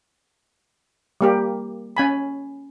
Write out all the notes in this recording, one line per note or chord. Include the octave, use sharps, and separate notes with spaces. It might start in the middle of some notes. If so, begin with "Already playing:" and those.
G3 A#3 G4
C#4 G#5 B5